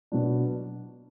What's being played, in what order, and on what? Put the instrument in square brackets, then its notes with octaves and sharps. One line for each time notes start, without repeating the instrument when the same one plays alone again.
[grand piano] B2 F#3 D4